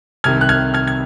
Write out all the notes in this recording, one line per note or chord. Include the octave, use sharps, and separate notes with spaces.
C2 C3 D#3 F6 G#6
F#6
F6 G#6
F6 G#6
G#6